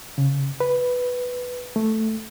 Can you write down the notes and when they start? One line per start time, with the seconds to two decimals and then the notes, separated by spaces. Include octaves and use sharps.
0.18 C#3
0.60 B4
1.76 A3